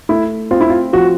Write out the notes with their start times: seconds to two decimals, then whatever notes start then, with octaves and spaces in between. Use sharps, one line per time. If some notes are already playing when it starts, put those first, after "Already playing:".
0.09 A3 E4
0.51 C4 F4
0.61 E4
0.70 F4
0.93 F3 F#4